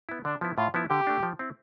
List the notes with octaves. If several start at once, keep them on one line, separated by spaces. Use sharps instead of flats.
B3 E4
D3 D4
F3 B3 E4
A2 F4
F3 B3 E4
D3 G4
A3 D4
F3
C4 E4